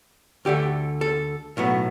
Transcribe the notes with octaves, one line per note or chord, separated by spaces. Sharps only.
D2 D3 A3 G4
A4
B1 A2 F#3 B3